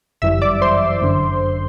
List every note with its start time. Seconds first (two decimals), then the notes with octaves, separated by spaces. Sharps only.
0.22 G1 F#2 E3 G3 E5 E6
0.42 D5 D6
0.62 C5 C6
1.02 G1 F#2 D3